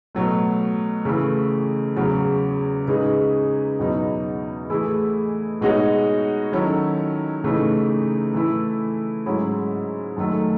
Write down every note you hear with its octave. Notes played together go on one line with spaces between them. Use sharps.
B2 F#3 A3
C#3 E3 A3
E2 C#3 F#3
C#3 G#3 D#4 G#4 B4
E2 B2 F#3 B3 D#4
E3 A3 E4 G#4
B2 G#3 D#4 F#4 C#5
D#3 F#3 C#4 E4 A4
C#3 E3 A3 D#4
E3 A3 E4 A4
G#2 F#3 C#4 E4 G#4
F#2 D#3 F#3 A3